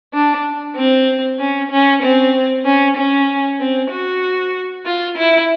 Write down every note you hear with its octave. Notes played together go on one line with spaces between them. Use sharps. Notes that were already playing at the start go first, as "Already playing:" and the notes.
D4
C4
C#4
C#4
C4
C#4
C#4
C4
F#4
F4
E4